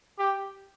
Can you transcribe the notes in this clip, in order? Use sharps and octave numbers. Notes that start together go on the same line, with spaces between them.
G4